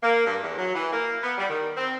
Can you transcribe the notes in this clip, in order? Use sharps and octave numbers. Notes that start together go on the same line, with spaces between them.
A#3
G2
E2
F#3
E3
A#3
B3
G3
D#3
C4